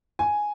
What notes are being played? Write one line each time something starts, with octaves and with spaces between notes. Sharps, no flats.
G#5